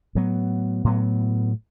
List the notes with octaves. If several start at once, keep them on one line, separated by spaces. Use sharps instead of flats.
A2 F#3 B3
A2 F#3 B3